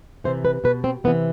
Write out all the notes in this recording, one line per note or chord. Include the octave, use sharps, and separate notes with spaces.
C3 E3 C5
B4
B2 B4
C4
C3 E3 B3